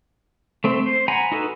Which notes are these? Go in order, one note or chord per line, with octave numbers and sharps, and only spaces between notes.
A3 C4
C5
F#5 G#5 A#5 B5
D#4 F#4 A4 B4